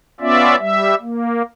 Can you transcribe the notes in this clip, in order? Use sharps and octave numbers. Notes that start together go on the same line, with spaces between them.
B3 C#4 F4 D5 E5
G3 E5
A#3